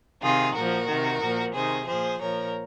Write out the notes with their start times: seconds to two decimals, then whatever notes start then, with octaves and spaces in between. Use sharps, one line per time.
0.22 C3 D#3 F4 G#4
0.55 A#2 F3 F#4 A#4
0.89 C3 D#3
1.22 A#2 F3
1.54 C3 D#3 G#4 C5
1.87 A#2 F3 G#4 C5
2.20 A#2 F3 A#4 C#5